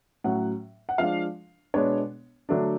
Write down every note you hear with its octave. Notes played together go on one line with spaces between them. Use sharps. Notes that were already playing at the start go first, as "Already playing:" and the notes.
A2 F#3 C#4 F#5
F#5
F3 G#3 D4 F5
B2 G#3 B3 D4 C#5
D3 F#3 A3 D4